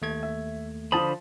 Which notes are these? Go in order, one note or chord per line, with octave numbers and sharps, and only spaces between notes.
D#2 A3 G#6
E5
D3 F3 C5 A5 B5 D#6